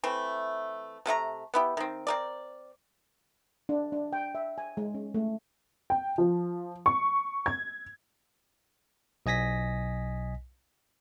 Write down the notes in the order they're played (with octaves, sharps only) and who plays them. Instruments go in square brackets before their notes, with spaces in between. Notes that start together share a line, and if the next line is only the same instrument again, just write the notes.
[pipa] E3 A3 C4
C3 A3 E4 A#5
B3 E4 G4
D#3 C4
C4 A#4 D5
[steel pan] D4
D4
G5
E5
G#5
G#3
C#4
A3
[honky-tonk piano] G5
F3
C#6
G#6
[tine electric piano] B1 D#5 G#5 A#6 B6